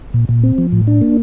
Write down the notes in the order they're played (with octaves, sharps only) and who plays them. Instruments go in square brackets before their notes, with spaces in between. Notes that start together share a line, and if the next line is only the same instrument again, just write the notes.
[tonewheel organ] A#2
A#2
C4
F3
A2
D4
A#3